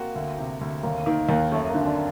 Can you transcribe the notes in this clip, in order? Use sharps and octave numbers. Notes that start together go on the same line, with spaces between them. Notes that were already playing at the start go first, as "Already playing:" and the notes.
Already playing: A#3 C4 F#4
D2
C3
D2
D#2 A#3
D#3 A#3
D#2 A#3
F#2 A3
A#3
D3
C4
D4